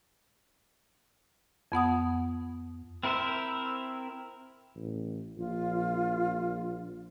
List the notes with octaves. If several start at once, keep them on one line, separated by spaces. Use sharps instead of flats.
F2 B3 F#5 D#6
C4 E4 A#4 C5 E5
A1
A#1 F4